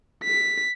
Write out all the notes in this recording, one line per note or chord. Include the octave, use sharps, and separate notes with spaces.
B6